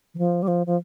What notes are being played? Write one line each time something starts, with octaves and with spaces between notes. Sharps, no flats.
E3
F3
G3
F3
F3